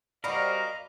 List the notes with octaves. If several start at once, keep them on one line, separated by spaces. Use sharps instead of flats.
G3 C4 F#4 A#4 D#5 F5 B5 D6